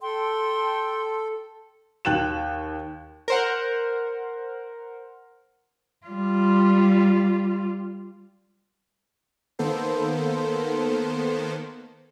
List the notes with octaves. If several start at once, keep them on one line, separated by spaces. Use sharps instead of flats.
A4 G5 C6
D#2 G5 F#6 A6 E7
A#4 C5 F#5
G3 F4
D#3 A#3 B3 A4 C5